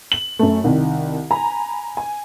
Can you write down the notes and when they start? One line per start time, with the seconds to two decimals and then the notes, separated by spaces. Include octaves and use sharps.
0.12 F#7
0.39 F#2 A3
0.64 C2 D#3
1.31 G#5 A#5 B5
1.97 G#5